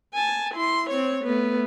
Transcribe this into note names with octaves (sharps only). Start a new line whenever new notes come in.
G#5 A5
E4 C6
C4 C#5
A3 B3